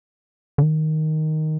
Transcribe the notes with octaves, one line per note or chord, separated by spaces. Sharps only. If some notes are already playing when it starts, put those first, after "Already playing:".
D3
D#3